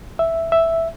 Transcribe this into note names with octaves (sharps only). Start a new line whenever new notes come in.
E5
E5